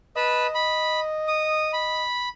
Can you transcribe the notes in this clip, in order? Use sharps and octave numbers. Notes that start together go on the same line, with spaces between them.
B4 D#5 A5 B5
B5
D#6
B5